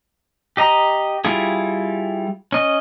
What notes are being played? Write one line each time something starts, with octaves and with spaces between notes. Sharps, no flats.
G4 D#5 A#5
G3 E4 F4 G#4
C#4 D#5